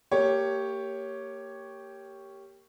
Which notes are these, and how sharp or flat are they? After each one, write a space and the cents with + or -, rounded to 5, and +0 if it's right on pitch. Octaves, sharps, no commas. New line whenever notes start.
A#3 -25 G4 +0 C#5 +0